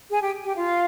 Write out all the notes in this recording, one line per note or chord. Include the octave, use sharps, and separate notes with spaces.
G#4 G#5
G4 G5
G4 G5
F4 F5